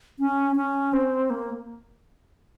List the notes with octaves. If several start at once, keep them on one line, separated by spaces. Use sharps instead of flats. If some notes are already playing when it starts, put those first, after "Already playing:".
C#4
C#4
C4
A#3